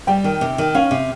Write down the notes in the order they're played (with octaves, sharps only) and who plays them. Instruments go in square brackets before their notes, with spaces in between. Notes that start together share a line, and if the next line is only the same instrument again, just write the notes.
[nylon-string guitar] G3 [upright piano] G5
[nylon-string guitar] D#3
C3
D#3
[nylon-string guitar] C#4 [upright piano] F5
[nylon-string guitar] C3